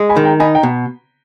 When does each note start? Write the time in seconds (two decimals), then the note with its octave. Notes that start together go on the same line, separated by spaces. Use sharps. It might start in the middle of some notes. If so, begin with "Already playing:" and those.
Already playing: G#3
0.09 G#5 B5
0.17 D#3
0.24 G5 A#5
0.40 D#4 G#5 B5
0.55 G5 A#5
0.63 B2